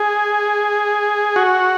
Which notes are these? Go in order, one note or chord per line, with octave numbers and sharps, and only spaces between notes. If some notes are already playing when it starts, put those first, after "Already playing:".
Already playing: G#4
F#4